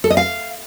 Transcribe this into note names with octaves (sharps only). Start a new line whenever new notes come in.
A4
D#5
F5